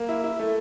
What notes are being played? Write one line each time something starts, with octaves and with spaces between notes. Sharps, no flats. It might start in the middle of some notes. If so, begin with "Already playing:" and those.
Already playing: A#3
E4
E4
A3